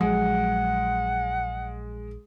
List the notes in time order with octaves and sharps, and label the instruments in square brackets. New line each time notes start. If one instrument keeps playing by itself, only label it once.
[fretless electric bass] A#1 F3 F#3 [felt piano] G#3 [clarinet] F#5